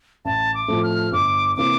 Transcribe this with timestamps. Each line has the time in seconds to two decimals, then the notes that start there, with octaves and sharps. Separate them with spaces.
0.25 A1 A5
0.54 D6
0.68 A2 F3 A3 C4
0.83 F6
1.12 G1 D6
1.56 C3 E3 A#3 D6